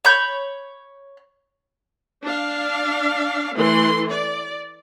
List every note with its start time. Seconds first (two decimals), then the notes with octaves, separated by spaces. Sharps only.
0.05 C#5 B5 G6
2.24 D4 F5
3.56 E3 A3 C6
4.11 D5